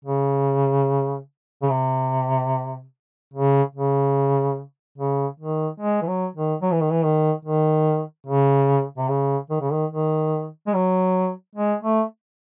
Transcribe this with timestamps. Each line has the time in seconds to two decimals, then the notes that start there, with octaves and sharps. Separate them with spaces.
0.05 C#3
1.62 C#3
1.70 C3
3.34 C#3
3.75 C#3
4.98 C#3
5.40 D#3
5.80 G#3
6.02 E3
6.08 F#3
6.36 D#3
6.62 F#3
6.72 E3
6.81 D#3
6.91 E3
7.03 D#3
7.45 D#3
8.27 C#3
8.98 C3
9.09 C#3
9.50 D#3
9.61 C#3
9.72 D#3
9.91 D#3
10.67 G#3
10.74 F#3
11.56 G#3
11.83 A3